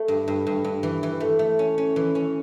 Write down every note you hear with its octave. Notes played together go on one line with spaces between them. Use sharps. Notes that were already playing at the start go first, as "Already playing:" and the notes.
Already playing: A3
G2
G2
G2
G2
E3
E3
A3
A3
C#4
C#4
E3
C#4